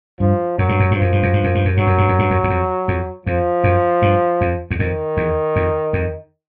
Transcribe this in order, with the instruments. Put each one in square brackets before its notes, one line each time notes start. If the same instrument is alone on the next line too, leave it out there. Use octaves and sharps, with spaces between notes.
[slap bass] G2 [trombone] F3
[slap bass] F#2 [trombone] F#3
[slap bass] G2
F#2
G2
[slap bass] F#2 [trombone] F3
[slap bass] G2
F#2
G2
F#2
G2
F#2
[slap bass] G2 [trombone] F#3
[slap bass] F#2
G2
F#2
G2
F#2
E2
F2
F2
[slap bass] F2 [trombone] F3
[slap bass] F#2
G2
F2
E2
[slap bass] F2 [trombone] D#3
[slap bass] E2
F2
F2